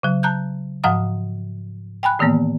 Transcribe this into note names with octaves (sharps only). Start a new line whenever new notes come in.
C#3 F#3
A5 A#5 F#6 G6
G#2 F3 F5 F#5 A#5 D#6
G5 G#5 B5 F#6
A2 D#3 E3 A#3 B3